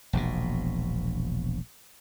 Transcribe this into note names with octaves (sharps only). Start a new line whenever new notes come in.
E1 A#1 B2